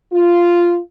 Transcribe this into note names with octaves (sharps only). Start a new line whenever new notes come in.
F4